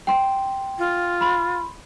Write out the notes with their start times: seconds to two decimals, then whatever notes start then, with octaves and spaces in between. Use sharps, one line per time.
0.07 G5 C6
0.79 F4
1.21 B5 C6